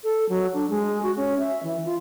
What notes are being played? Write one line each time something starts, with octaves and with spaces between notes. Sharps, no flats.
A4
F#3
D4
G#3
F#4
C#4
E5
E3
F4